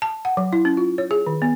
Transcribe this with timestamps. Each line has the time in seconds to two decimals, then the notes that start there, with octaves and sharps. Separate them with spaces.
0.02 A5
0.25 F#5
0.37 F#3
0.53 E4
0.65 C#4
0.77 F4
0.98 C#5
1.11 G#4
1.27 D#3
1.42 B3